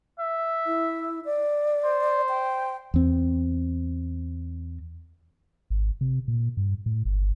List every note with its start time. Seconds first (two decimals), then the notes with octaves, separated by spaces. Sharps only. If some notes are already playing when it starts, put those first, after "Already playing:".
0.20 E5
0.67 E4
1.25 D5
1.85 C5
2.29 G5
2.94 E2 C4
5.70 G#1
6.01 C3
6.28 A#2
6.57 G2
6.86 A2
7.05 G1